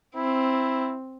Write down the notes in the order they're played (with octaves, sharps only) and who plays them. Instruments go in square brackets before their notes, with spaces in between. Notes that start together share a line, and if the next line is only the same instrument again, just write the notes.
[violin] C4 [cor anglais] E4